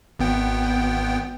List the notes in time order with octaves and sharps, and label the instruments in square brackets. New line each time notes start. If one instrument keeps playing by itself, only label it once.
[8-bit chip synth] G#1 B3 G5